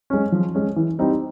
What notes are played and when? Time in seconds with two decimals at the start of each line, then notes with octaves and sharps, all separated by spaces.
0.10 G#3 C#4
0.32 F3
0.54 G#3 C#4
0.76 E3
0.99 G3 C4 D#4